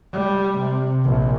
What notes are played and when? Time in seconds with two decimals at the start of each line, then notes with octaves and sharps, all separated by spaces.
0.13 G3
0.59 C3
1.04 A#1